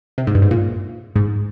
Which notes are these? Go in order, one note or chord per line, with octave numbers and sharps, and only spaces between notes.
C3
G#2
G2
G#2
A#2
G#2